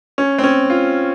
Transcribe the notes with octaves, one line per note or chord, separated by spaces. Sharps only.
C#4
C4
C#4
F4